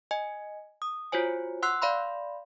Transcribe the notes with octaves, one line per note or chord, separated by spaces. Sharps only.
D#5 G#5
D#6
F4 F#4 C5 C#5 G#5
F#5 C6 E6 F#6 C7
D5 F5 B5 C6